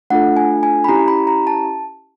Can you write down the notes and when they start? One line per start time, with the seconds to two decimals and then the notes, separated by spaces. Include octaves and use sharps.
0.10 A3 D4 F4 A4 F#5
0.37 G#5
0.63 G#5
0.84 B5
0.89 C#4 E4 G4 A#5
1.08 B5
1.27 A#5
1.47 A5